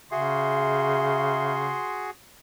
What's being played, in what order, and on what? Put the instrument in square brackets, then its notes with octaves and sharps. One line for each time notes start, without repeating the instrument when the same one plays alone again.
[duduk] C#3 [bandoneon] F#4 G#4 [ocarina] E5 [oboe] C6